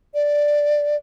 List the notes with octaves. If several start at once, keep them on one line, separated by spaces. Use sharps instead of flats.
D5